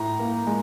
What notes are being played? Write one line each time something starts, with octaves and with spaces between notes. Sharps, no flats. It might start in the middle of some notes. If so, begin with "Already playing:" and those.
Already playing: A2 A#5
A#3
G#3